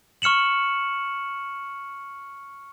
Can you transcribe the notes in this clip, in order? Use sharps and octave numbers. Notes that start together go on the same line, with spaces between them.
C#6 F6 C#7 E7 F#7